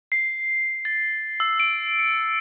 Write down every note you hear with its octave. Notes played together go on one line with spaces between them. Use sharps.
C7
A6
E6
D7
C#7